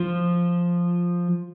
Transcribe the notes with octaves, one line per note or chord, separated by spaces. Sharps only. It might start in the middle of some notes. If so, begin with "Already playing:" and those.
Already playing: F3